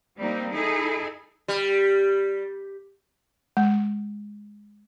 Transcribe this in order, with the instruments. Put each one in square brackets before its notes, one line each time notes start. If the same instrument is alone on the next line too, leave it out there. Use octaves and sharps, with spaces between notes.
[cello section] G3 A#3 C4 D#4
D#4 E4 G#4 A4 D#5
[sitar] G3
[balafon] G#3